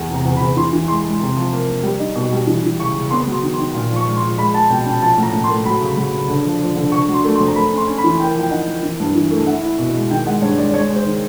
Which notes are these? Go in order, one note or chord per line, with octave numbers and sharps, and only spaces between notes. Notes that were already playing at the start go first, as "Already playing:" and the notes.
Already playing: E2
C3 A#5
E2
B5
E2
E3 C6
E3
G#3 C6
G#3
C3
F3
A#3
A#3
G3
D#4
B2
G3
E3
E3
C#3 C#6
C#3
B3 C6
F#3
C6
D#3
C6
D#3
A#2
F3
C#6
G#3
C6
F3
G#3 B5
G#3 A5
B2 G5
C#4 G5
F3 A5
A2
A#5
A2
C6
A3
F#3 B5
C#3
F#3
C#3
D3
F3
F3
D3
D3 C#6
F#3
C6
A3
C6
F2
A#5
A3 B5
C#4
C6
C#4
B5
E3
A#3 G5
F3 G5
D#4 F#5
A#3
E3
G2
E3
A3
E4 F#5
E4
B2
G#3
D#3 G5
G#3 F#5
G2 C#5
G#3 D5
G#3 C#5
G#3 C5
D#3